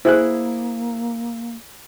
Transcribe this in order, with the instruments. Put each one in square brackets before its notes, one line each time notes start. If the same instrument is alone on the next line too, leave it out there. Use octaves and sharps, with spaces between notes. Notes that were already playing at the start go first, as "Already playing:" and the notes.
[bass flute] A#3 [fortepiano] E4 G#4 F#6 [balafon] C5